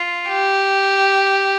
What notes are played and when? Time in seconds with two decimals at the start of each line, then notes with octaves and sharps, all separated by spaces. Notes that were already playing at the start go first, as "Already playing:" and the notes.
Already playing: F4
0.28 G4